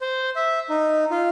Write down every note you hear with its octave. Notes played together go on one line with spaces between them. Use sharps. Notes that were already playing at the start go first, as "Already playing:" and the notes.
C5
E5
D#4
F4